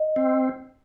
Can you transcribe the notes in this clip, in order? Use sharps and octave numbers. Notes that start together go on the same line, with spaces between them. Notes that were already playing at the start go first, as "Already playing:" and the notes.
Already playing: D#5
C4